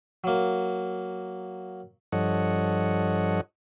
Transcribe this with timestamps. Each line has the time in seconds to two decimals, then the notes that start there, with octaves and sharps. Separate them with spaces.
0.24 F#3 A#3
2.12 G2 F3 A4 C#5 D#5 F#5